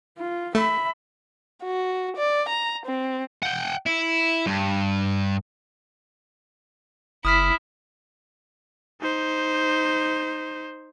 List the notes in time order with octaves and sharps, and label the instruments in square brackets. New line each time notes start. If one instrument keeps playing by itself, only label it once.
[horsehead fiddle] F4
[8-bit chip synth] A3 [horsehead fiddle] E5 B5
[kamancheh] F#4
D5
A#5
C4
[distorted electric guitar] F#5 G5
E4
G2
[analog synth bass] F#1 [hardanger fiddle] E4 [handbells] D#6 F6 B6
[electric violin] D#4 C5